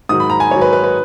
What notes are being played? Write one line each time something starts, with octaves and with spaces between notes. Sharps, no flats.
G#2 D#3 F#3 D#6
B5
A#5
G#5
G#2 D#3 F#3 C#5
B4
B4
B4